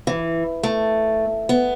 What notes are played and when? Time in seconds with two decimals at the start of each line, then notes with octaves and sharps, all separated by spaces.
0.07 E3
0.63 A3
1.49 B3